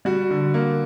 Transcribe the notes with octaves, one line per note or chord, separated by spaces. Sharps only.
G3 F#4
D3
A#3